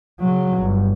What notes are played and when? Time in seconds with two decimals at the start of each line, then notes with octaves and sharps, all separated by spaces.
0.20 C#3 F#3
0.59 G1